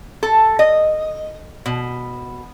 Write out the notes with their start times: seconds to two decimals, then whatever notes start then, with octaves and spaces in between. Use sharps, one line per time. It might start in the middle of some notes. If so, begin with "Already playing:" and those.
0.23 A4
0.59 D#5
1.66 B2